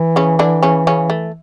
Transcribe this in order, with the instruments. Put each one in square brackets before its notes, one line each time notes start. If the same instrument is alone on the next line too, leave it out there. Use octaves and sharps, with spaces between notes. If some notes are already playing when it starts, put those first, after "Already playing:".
Already playing: [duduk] E3
[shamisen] C#3 C#4
D3 D4
C#3 C#4
C#3 C#4
A3